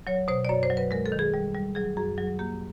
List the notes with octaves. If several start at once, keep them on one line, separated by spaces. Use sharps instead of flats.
F#3 C#5
B2 C5
D5
F#2 C#5
C5
F#3
B4
G#3 A#4
A4
D#3
G#4
G3
G3
F#3 G#4
F#2 G#4
F#3 G#4
A#3 G4